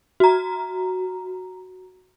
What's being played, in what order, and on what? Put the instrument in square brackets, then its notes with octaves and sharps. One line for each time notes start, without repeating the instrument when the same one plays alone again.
[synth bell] F#4 A#5